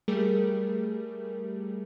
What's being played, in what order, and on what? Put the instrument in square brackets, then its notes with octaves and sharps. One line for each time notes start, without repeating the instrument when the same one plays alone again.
[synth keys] G3 A3 G4 G#4 A#4